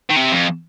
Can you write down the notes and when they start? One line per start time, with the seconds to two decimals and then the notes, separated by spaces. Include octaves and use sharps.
0.10 D#3
0.17 C3
0.32 F2